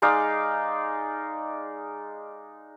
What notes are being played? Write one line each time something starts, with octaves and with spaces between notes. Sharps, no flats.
G#3 D#4 D5 F5